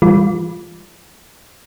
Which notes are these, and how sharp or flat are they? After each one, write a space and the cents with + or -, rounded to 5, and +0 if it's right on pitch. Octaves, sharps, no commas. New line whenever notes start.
E3 +40 G3 +35 F4 +0